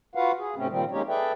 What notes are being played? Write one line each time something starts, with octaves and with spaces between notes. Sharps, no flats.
F4 F#4 B4 F5 F#5
G#4
G#2 C3 A3 C4 C#4
A#2 D#3 F3 G3 C4
G#3 A#3 C#4 D#4 G4 C#5
G#4 A4 B4 D5 E5 G5